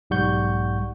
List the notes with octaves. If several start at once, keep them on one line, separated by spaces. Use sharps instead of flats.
B1 G#2 G3 F#5 C#6 G6